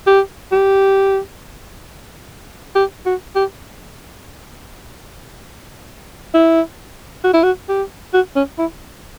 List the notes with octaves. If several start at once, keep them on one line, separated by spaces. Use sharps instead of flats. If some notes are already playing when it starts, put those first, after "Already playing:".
G4
G4
G4
F#4
G4
E4
F#4
E4
F#4
G4
F#4
C#4
E4